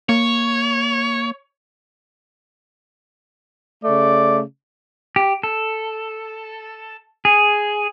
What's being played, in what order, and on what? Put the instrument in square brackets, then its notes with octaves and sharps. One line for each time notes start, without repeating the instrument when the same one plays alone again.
[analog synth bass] A#3 [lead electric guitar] C#5
[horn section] C#3 A3 D5
[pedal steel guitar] G4
A4
G#4